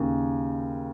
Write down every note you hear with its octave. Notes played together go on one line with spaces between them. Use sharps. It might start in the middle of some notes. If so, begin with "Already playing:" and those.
Already playing: D#2 C#3